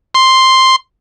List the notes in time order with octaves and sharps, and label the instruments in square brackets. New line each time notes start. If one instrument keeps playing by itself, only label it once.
[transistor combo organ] C6